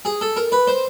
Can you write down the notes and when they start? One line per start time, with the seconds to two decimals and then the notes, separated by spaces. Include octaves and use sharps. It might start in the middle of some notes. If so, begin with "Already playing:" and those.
0.05 G#4
0.21 A4
0.36 A#4
0.52 B4
0.67 C5